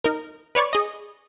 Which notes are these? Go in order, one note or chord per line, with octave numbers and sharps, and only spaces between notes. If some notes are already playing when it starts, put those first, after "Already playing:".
D#4 A#4
B4 C#5 D5 C#6
G#4 D#5